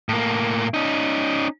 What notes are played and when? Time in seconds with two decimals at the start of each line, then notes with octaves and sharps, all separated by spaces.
0.09 A2 A#3
0.74 C#4 D#4